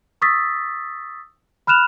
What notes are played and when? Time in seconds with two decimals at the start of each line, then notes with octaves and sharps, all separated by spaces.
0.22 C#6 D#6 E6 A6 B6
1.67 B5 F6 F#6 E7 F7